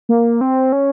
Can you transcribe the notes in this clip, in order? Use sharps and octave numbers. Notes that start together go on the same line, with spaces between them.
A#3
C4
C#4